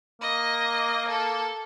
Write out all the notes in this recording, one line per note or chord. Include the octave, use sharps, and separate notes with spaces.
A#3 D#5
A4